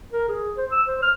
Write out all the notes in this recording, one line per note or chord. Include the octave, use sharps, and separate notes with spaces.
A#4
G#4
C5
E6
C5
F6